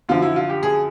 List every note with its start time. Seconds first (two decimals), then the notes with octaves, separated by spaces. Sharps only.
0.09 F#2 D3 F3 F4
0.22 E4
0.36 F4
0.50 G4
0.63 G#4